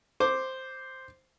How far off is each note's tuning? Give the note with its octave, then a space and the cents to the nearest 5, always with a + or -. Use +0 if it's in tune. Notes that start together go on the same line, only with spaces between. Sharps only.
C5 +0 D6 +0